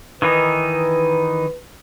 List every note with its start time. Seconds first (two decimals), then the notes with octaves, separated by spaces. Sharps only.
0.22 D#3 E3 D#4 B4